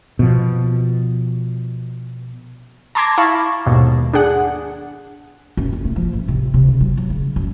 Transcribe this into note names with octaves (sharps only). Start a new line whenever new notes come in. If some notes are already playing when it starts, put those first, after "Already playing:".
B2 F3
A5 A#5 C6 D6 G#6 A#6
E4 F5 A5 B5 C#6
D#2 G#2 B2
D4 G#4 F#5
F#2
F2
A3
F3
A1
C3
C3
C#3
F#3
F#3
C#3
F#2